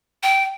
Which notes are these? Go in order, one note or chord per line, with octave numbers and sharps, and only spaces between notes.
G5